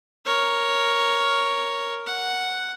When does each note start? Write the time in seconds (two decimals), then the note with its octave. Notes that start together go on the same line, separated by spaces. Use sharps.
0.25 A#4 C#5
2.06 F#5